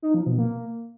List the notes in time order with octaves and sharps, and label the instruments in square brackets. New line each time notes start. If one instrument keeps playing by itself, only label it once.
[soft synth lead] D#4
F3
B2
A#3